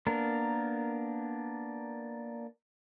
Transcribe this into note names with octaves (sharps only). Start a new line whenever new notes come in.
A#3 B3 D4 A#4